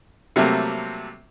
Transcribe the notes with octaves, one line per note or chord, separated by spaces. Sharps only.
C3 F#3 G3 A3 A#3 C4